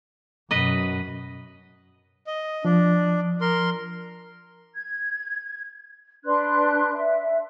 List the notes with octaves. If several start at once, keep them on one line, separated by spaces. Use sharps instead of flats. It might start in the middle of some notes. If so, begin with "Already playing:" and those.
F#2 B2 B4 D#5
D#5
F3 D4
A#4 C6
G#6
D4 B4 C6 F#6
E5